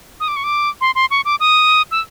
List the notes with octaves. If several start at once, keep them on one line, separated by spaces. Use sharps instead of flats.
D#6
D6
C#6
D6
C6
C6
C#6
D6
D#6
E6